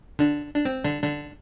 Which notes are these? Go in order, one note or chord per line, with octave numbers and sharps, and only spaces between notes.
D3 D4
D4
C4
D3 D4
D3 D4